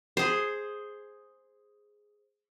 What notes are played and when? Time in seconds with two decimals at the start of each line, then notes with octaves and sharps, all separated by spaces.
0.17 G#4 C5